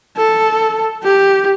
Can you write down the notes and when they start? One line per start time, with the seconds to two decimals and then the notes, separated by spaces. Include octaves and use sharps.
0.17 A4
1.04 G4